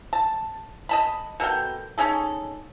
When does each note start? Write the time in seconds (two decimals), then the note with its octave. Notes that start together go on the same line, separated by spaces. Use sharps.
0.13 A5
0.89 D#5 A5 B5
1.40 B2 A4 A#4 G5
1.98 C#4 D#4 G#4 A4